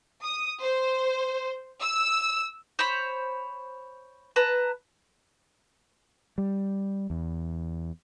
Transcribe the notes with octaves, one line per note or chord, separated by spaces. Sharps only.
D#6
C5
E6
C5 C#5 B5
B4 A5 A#5
G3
E2